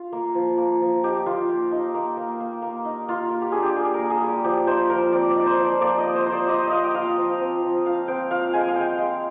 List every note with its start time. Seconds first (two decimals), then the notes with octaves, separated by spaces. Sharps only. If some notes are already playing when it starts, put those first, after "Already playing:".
Already playing: F4
0.12 A#3
0.35 F3
0.58 A#3
0.81 F3
1.04 D#4 G4
1.26 A#3 F4
1.49 A#3
1.71 D#4
1.94 A#3
2.17 A#3
2.40 A#3
2.62 A#3
2.85 D#4
3.08 A#3 F4
3.30 A#3
3.42 G4
3.52 D4 G#4
3.63 G4
3.76 A#3 G#4
3.94 A#4
3.99 A#3
4.10 G#4
4.22 G3
4.28 G4
4.44 F3 G4
4.67 D#4 C5
4.89 F3 A#4
5.12 C4 D5
5.30 D5
5.36 D#4
5.46 C5
5.57 F3
5.64 D5
5.81 A#3 D5
5.98 D#5
6.04 A#3
6.15 C5
6.26 F4 C5
6.32 D5
6.49 F4 D#5
6.67 A#3 D#5 F5
6.84 G5
6.95 F4 F5
7.17 F3
7.40 C4
7.62 F3
7.86 F4 F5
8.08 C4 G5
8.31 F4 F5
8.53 G#3 G#5
8.60 G5
8.68 F5
8.76 G#3 G5
8.99 G#3